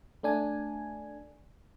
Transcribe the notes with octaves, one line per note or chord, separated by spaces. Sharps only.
A3 D4 G#5